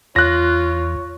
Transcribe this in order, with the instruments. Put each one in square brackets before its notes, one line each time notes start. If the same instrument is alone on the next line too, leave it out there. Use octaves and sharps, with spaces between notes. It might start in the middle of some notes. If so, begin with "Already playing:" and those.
[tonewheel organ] E2 [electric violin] F4 [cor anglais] C#5 [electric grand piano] F#6 A#6